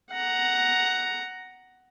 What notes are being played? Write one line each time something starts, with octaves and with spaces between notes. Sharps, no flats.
F#5 A#5